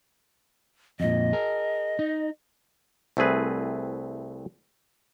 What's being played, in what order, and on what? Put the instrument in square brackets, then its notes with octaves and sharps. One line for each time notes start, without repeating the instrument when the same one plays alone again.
[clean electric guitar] F2 A#2 [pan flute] D#5
[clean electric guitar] G#4 A#4
D#4
[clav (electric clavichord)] C2 A3 C4 G#4 B4